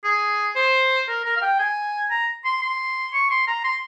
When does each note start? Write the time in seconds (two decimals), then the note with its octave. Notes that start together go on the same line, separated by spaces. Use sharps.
0.04 G#4
0.56 C5
1.08 A#4
1.25 A#4
1.37 F5
1.42 G5
1.59 G#5
2.11 A#5
2.45 C6
2.62 C6
3.13 C#6
3.31 C6
3.47 A#5
3.64 C6